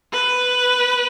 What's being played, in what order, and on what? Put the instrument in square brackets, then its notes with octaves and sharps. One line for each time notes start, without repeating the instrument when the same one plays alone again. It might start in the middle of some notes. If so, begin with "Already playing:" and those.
[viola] B4